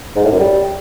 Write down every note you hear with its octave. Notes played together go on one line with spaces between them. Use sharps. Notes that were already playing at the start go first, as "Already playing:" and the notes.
G#2
A2
F#2
G3